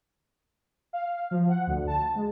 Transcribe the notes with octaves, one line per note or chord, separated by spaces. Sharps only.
F5
F3
F#5
D2
A5
G#3